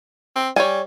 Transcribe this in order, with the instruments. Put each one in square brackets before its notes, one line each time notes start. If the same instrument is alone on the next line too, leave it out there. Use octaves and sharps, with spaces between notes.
[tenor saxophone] C4
[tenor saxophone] G3 [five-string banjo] C#5 G#5